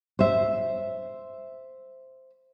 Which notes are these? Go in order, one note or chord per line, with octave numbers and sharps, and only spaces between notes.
C5 E5